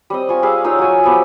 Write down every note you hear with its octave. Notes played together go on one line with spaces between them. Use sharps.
G3 C4 D#5
F4 G#5 C#6
G3 G#4 E5 F5
D#4 F4 C#5 E6
F#3 G#5
F3 B3 G4